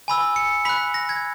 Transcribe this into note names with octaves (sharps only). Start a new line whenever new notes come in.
G#5 B5 E6
C#7
B5 F#6 B6
A#6
G#6